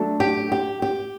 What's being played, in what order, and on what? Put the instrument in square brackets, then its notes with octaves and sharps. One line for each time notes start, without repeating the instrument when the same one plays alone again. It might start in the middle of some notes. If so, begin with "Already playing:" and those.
Already playing: [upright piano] F#3 A3 D4 A4
[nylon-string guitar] G4
G4
G4